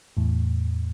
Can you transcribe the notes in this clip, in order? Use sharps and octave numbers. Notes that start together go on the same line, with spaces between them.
E2 A2